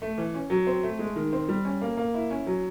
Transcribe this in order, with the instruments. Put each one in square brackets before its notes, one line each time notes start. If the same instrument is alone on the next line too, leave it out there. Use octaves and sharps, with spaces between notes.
[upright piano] A3
E3
C#4
F#3
C4
A3
G#3
D#3
C4
G3
C#4
A#3
A#3
E4
C#4
F#3